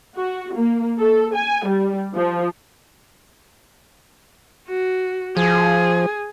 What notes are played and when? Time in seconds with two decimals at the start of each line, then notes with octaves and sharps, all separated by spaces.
0.16 F#4
0.55 A#3
0.98 A4
1.34 G#5
1.66 G3
2.14 F3
4.68 F#4
5.37 F3 G#4